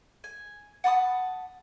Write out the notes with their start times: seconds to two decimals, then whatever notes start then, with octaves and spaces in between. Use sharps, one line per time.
0.24 G#5
0.84 F#5 A5 B5 D#6